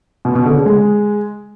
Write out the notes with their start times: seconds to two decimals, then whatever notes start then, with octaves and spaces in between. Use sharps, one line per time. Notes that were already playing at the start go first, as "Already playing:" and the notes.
0.25 B2
0.35 B2
0.45 D3
0.56 C#3
0.66 G#3